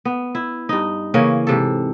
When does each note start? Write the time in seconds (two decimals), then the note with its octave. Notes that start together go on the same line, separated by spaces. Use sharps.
0.05 B3
0.35 E4
0.69 G2 D#4
1.14 C#3 E3 A#3 C#4
1.47 G#2 C3 A4